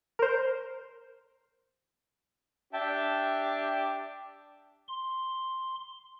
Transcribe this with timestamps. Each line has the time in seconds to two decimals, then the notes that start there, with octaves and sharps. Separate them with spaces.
0.19 A#4 C5
2.73 D4 G4 E5 G5 A5
4.88 C6